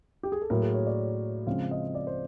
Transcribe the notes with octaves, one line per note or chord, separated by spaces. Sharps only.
G4
G#4
A4
A2 F#3 A#3 A#4
G#4
C#5
D5
C#3 F3 G#3 C4 F5
D#5
D5
C5